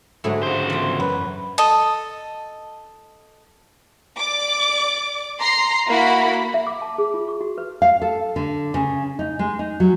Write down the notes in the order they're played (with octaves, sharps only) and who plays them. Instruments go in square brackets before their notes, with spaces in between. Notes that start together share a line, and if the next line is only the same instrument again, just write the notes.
[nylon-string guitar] G#2 D3 F#3 [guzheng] A3 E4 G#4
[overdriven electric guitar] C#2 C5
[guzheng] E3 G5
[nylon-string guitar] F#2 [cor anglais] B4
[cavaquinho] A4 D#5
[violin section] D5 D6
A#5 C6 C7
A#3 E4 F#4 B5
[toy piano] E5
D6
A5
G#4
F4
C#6
F#4
B4
[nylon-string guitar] F5
A4
D3
C#3
D#4
G#3
D#4
F#3